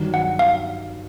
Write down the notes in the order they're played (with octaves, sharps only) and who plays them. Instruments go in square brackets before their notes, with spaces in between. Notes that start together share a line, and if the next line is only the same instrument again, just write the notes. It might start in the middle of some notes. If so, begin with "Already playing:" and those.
Already playing: [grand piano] G2 D#3 F#3
[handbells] F#5
F5